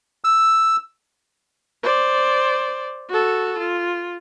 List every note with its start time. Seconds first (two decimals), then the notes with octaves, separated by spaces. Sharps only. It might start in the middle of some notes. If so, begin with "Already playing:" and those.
0.24 E6
1.83 C5 D5
3.09 F#4 A4
3.59 F4